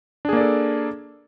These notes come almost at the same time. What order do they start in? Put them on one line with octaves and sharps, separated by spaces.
D4 G#4 A#3 D5 A4